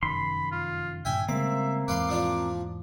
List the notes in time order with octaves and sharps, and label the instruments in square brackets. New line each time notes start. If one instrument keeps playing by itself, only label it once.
[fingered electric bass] F1 F#2 D#3 [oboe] B5 [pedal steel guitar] C6
[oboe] F4
[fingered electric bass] G2 A#2 D3 [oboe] E5 [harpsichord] G5 G#5
[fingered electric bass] C#3 G3 G#3 [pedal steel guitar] A#3 C4 [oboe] E5 [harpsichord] D6
[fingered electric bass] E2 G#2 E3 [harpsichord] B4 F5 C6 [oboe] D6
[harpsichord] F3 D4 F4